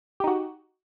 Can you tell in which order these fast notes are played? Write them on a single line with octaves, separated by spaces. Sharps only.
G4 D#4 F#4